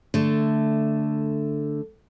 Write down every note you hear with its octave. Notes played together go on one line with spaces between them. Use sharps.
D3 A3